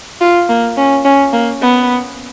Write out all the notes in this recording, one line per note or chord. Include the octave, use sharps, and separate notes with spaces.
F4
A#3
C#4
C#4
A#3
B3